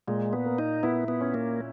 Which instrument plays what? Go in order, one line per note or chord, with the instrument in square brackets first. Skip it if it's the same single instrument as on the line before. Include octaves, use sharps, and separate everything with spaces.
[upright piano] A#2 [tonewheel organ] G#3
[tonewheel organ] B3
[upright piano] A#3
[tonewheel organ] D#4
[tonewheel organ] B3 [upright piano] E4
[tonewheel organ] B3
[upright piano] C#4
[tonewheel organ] A#3